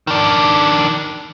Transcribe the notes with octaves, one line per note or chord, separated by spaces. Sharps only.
D#3 D4